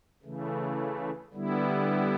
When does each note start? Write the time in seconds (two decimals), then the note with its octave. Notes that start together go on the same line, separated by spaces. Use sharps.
0.23 C#3 E3 A3
1.33 D3 G3 B3 E4